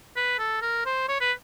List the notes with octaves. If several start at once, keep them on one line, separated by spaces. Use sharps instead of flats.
B4
A4
A#4
C5
C#5
B4